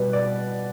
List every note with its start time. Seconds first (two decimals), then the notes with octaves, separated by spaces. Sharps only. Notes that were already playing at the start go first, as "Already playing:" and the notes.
Already playing: B2 G3 B3 B4
0.13 D5